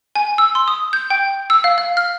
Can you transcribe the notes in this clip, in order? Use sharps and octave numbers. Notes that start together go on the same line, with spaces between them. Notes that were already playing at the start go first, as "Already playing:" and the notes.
G#5
E6
C6
D#6
G6
G5
E6
F5
F5
F6